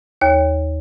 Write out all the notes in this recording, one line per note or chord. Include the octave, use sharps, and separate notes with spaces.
D#2 C#5